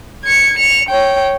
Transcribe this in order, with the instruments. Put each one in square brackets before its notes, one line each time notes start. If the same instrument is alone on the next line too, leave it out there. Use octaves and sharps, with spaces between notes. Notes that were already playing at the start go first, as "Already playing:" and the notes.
[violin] G#6 C#7
C#7 F7
C#5 G5